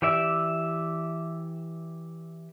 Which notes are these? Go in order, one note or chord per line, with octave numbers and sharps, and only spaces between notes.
E3 G4 D5 E5